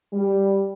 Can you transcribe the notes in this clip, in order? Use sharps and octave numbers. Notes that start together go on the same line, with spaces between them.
G3